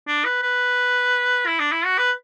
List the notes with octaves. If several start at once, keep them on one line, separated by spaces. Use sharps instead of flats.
D4
B4
B4
E4
D4
E4
F#4
B4